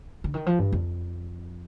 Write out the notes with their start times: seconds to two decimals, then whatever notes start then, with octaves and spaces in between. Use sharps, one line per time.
0.24 D3
0.34 D#3
0.46 F3
0.59 G2
0.72 F2